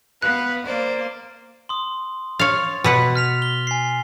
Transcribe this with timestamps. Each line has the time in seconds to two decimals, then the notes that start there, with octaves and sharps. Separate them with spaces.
0.22 B3 B4 F5 F#6
0.66 A#3 C5 D5
1.69 C6 D#6
2.39 C#5 F5 A6
2.84 B2 B4 F#5
3.15 F6 B6 F7
3.42 G7
3.67 G#5 C7